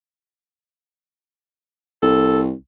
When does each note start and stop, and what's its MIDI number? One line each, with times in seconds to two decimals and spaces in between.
2.02 2.53 36
2.02 2.40 69